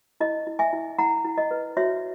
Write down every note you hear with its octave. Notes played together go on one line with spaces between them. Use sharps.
E4 D#5
E4
E5 G#5
E4
E4 F#5 A#5
E4
D#5
B4
F#4 C#5 E5